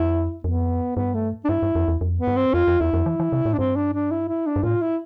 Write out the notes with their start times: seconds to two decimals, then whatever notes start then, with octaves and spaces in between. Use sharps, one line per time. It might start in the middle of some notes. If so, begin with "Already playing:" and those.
Already playing: F2 E4
0.44 F2 B3
0.96 G2 B3
1.14 A3
1.45 D4
1.49 G2 E4
1.63 G2
1.75 F2
1.88 E2
2.01 F2
2.19 B3
2.27 G2
2.36 C4
2.54 F2 F4
2.68 F2
2.80 E2 E4
2.93 F2
3.06 E3
3.20 E3
3.32 C3
3.45 A2
3.53 D4
3.58 G2 C4
3.76 D4
3.93 D4
4.11 E4
4.28 E4
4.46 D4
4.56 G2
4.63 A2 F4
4.81 E4